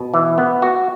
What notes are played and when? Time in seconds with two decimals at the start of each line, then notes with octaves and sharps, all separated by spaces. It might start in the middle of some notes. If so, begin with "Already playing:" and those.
Already playing: B2
0.14 E3
0.38 B3
0.62 F#4